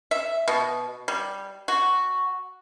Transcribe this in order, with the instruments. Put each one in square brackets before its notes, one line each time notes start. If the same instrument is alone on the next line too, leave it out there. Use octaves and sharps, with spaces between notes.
[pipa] E5
B2
G3
F#4